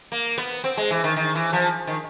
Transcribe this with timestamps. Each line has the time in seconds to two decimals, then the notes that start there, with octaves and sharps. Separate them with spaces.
0.12 A#3
0.38 B3
0.64 C4
0.77 G#3
0.91 E3
1.04 D#3
1.16 D#3
1.35 E3
1.53 F3
1.87 D#3